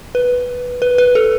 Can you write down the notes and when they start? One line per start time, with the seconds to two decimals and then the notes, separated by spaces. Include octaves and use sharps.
0.15 B4
0.82 B4
0.98 B4
1.15 A4